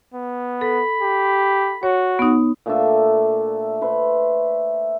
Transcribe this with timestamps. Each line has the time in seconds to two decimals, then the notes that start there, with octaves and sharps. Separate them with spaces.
0.14 B3
0.61 A4 B5
1.01 G4
1.83 F#4 C#5
2.19 B3 D#4
2.66 A#2 A3 D4 E5
3.82 B4 C5 E5